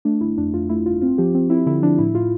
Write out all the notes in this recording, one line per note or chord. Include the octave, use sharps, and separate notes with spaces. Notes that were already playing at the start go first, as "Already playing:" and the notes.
A3 D4
G1 E4
F2 D4
F2 F4
A3 E4
G1 F4
C4 F4
F3 G4
C4
C4 E4
D3 E4
F3 D4
A2 E4
A2 F4